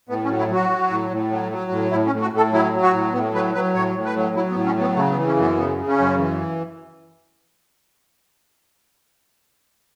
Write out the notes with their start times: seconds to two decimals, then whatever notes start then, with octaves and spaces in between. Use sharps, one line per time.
0.09 A2 B3
0.25 C#4
0.30 F#3
0.39 E4
0.50 F#3 F#4
0.70 F#3
0.90 A2
1.11 A2
1.31 F#3
1.52 F#3
1.71 A2
1.91 A2 E4
2.06 C#4
2.12 A2
2.22 F#4
2.33 A2 A4
2.53 F#3 E4
2.73 F#3
2.82 F#4
2.93 A2
3.13 A2 B3
3.34 F#3 B4
3.54 F#3 B4
3.74 A2 C#5
3.95 A2
4.05 B4
4.16 F#3
4.35 F#3 E4
4.50 B3
4.56 A2
4.66 C#4
4.76 F#3 B3
4.96 C#3 A3
5.12 B3
5.17 E3
5.27 C#4
5.36 F#2
5.42 B3
5.57 C#3 B3
5.77 C#3
5.88 C#4
5.98 F#2
6.18 E3